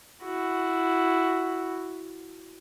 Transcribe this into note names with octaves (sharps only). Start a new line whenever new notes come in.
E4 F#4